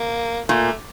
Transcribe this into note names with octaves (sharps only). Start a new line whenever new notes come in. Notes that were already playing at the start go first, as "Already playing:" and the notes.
Already playing: A#3
A#2 A3